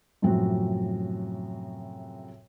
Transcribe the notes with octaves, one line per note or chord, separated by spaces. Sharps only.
F#2 A2 C3 F3 C4 F#4